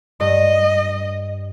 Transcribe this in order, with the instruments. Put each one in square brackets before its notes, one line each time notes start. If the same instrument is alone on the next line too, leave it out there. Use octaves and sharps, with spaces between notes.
[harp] G2 [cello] D#5